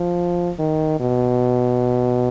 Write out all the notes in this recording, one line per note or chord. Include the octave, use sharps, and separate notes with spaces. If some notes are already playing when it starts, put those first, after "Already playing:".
Already playing: F3
D#3
B2